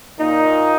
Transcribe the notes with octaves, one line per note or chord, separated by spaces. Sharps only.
A#2 D#4